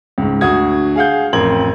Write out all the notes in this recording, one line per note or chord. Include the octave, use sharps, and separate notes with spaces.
C#2 G#2
D2 F#4 D#6 G#6
G#4 F5 F#5 G6
A1 F2 A#4 C6 G#6 F#7